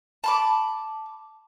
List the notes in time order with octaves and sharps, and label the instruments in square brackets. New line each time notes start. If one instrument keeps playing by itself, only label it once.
[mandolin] A5 B5 D6